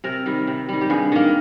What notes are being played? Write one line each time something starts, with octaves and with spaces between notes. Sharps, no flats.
C3 A#4
D#3 G3
C3
D#3 G3
G4
G2 G#4
D#3 A#3